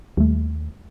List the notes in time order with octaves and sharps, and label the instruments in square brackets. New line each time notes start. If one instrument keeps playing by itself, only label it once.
[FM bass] D#2 [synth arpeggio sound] G3 A3